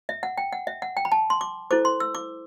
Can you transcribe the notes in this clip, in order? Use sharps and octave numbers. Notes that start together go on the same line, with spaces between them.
E5
F#5
G5
F#5
E5
F#5
G5
B5
A5
C6
D6
E4 A4 C5 D6
C6
E6
D6